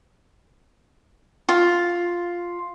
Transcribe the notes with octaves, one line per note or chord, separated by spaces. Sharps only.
F4